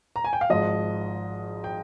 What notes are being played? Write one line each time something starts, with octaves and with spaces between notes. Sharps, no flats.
A#5
G#5
G5
F5
G#1 G#2 F3 D#5
G5